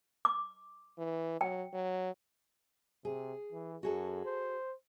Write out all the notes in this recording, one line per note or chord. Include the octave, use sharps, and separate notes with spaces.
D6
E3
F#3 G5
F#3
C3 G#4
E3
F#2 F#4 G#4 A4
C5